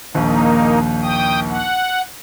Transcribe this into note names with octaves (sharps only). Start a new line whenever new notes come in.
A#1 D#2 A#3 D#4
G5 D#6
F#5